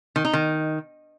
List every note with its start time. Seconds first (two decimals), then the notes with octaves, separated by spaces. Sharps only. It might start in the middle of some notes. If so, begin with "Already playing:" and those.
0.16 D#3
0.25 D#4
0.33 D#3